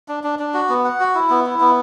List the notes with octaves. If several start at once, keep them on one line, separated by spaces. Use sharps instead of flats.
D4
D4
D4
F#4
B3
F#5
F#4
E4
B3
E4
B3